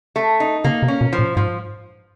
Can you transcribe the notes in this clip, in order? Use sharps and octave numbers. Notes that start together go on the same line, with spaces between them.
A3
D#4
C#3 A#3
C3
C#4
B2
F3
A#2
G#2 F3